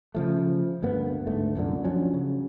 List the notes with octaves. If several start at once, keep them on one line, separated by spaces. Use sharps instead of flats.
C#3 F3 A3
D2 G2 A#3 B3
D2 G#2 A3
C2 F#2 A#2 D3
F3 F#3 C#4 D4
C#3